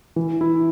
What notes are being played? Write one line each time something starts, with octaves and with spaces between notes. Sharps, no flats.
E3
E4